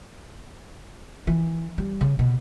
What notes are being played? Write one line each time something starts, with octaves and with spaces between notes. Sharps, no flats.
E3
G3
C#3
B2